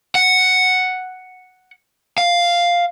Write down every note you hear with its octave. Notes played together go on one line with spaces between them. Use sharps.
F#5
F5